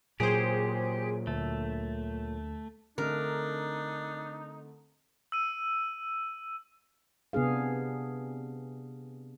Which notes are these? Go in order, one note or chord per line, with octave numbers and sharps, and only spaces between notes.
A#2 F#3 G4 G#4 C5
D2 A3
D3 A3 C4 D4 D#4 A#4
E6 D#7
C3 B3 D4 G#4 F5